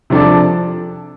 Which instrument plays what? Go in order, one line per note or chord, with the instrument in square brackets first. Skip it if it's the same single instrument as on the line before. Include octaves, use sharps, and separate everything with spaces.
[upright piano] C3 F3 D4 A4 D5